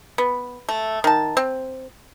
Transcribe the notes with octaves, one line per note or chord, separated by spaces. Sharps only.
B3
A3
D#3 A5
C4